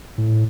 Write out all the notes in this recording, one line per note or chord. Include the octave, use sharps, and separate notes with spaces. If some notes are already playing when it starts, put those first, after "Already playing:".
A2